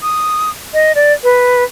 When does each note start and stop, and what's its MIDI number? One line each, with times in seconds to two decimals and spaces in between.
0.02 0.50 87
0.74 0.92 75
0.95 1.13 74
1.24 1.64 71